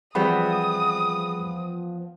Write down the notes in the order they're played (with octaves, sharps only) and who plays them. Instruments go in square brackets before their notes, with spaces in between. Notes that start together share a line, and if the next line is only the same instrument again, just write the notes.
[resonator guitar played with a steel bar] E2 B3 C4 [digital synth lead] F3 [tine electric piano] G3 G#4 B5 [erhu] D#6